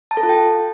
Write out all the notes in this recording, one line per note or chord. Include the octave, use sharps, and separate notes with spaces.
A5
A4
F4
G5